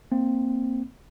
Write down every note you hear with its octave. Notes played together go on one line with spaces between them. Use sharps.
A#3 C4